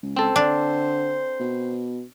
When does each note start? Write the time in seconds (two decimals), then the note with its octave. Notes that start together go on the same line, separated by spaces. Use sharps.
0.03 C#2
0.17 C4 A4 C5
0.36 D3 D4
1.40 B2